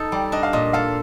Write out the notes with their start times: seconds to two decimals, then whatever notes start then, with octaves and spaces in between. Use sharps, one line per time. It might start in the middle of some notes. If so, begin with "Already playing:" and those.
Already playing: D#4 A4
0.12 G3 D5
0.32 D4 D#5
0.43 F5
0.53 A#2 D#5
0.73 A4 F5